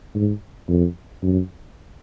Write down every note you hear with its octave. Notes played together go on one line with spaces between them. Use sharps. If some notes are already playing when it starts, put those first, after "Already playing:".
G#2
F2
F#2